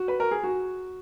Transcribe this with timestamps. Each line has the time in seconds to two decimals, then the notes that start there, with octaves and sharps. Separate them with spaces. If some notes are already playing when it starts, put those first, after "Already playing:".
Already playing: F#4
0.08 B4
0.20 A#4
0.31 G#4
0.43 F#4